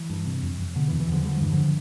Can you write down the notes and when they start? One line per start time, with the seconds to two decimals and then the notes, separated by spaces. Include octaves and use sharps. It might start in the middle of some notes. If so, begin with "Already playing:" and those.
Already playing: E3
0.10 G2
0.26 C3
0.43 F2
0.59 F2
0.76 B2 D3
0.88 E3
0.92 E2
1.00 E3
1.08 E2 D3 F3
1.25 D3 G3
1.33 F3
1.41 G2 E3
1.51 D3 F3